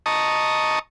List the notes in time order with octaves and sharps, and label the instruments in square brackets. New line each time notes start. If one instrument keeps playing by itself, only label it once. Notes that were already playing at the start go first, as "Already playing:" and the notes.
[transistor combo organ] D#5 A5 A#5 C#6 D#6